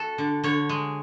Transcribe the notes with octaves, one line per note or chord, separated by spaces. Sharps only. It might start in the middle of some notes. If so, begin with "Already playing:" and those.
Already playing: F#4 A4
D3
D3 C#5
G#3